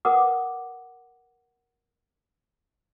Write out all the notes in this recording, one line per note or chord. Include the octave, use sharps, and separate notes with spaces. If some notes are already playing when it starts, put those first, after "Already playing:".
A#4 B4 F#5 D6 D#6